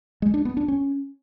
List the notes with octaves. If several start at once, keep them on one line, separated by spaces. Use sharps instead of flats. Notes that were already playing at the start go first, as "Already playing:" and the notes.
G#3
D4
B3
D4
C#4